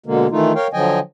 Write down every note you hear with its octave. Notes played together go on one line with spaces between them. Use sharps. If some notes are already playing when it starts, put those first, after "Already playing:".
B2 D3 G#3 A#3
D#3 E3 A3 D#4 F4
A#4 C#5 F5 G5
D3 F3 F#3 D#5 G5 G#5